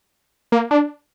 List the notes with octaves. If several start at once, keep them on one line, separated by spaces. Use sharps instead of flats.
A#3
D4